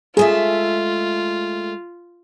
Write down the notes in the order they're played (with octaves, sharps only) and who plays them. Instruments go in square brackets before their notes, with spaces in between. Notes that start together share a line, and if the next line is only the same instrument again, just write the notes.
[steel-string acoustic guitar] G#3 A3 E5 [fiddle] F4 [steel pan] G#4